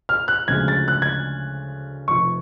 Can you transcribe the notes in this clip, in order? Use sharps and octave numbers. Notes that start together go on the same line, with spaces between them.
F6
F#6
D2 C#3 F3 G#3 G#6
A6
F#6
G#6
F1 F2 F3 C#6